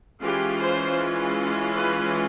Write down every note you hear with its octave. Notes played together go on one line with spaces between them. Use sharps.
E3 G#3 C#4 F4 G4
C5
B4